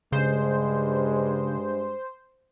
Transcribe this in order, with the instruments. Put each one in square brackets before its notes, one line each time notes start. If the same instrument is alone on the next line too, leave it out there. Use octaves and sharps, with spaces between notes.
[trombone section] G2 G#3 [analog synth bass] C#3 [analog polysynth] C5